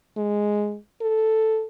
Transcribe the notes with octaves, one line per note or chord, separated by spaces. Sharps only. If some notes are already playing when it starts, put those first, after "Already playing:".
G#3
A4